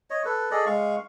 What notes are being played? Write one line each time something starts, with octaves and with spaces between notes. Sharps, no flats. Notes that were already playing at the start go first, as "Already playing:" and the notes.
C#5 D#5
A4 B4
G#4 A4 D5 D#5
G#3 F5 C#6